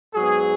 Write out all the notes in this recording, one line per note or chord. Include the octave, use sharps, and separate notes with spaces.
G#2 F#3 B3 G#4